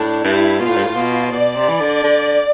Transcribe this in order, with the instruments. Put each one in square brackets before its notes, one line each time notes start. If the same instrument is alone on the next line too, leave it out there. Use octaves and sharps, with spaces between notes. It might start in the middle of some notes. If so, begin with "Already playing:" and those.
Already playing: [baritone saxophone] A2 [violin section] D4
[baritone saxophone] G2 [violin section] E4
[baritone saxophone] B2 [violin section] F4
[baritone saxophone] A2
G2
A2
B2
[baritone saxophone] B2 [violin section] D5
[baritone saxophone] C3
E3
D3
D3